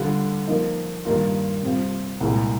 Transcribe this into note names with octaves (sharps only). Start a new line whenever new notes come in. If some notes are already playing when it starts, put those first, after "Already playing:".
Already playing: D3 G3 D4 F4
F3 A#3 D#4
G2 D#3 A#3 F4
C3 G3 C4 F4
C2 A#2 G#3